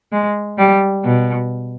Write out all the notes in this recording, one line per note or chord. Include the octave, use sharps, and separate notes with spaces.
G#3
G3
B2